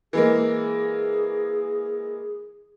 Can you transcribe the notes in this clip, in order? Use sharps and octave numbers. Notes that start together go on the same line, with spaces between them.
E3 G#3 A#3 G#4